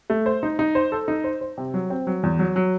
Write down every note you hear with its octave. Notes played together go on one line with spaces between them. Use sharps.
A3
C5
D#4
D#4
C5
A4
D#4
C5
C5
C3
F#3
C4
F#3
E2
F#3
F#3